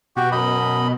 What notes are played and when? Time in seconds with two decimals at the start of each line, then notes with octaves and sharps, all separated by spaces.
0.16 B2 F#4 G4
0.32 F#2 D#5 B5